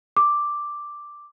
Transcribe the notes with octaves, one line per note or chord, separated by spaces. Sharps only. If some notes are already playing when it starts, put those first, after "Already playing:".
D6